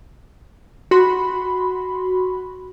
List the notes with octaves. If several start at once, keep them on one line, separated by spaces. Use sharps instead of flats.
F#4 B5 C6